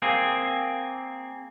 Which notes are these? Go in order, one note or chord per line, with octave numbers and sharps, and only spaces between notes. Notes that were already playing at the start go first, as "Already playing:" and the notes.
A#3 C4 G#4